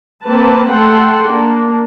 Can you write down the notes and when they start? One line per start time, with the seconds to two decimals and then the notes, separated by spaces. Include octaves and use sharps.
0.23 A#3 C4 B4 A5
0.69 A3 A4 F#5 G5 C6
1.24 A#3 D4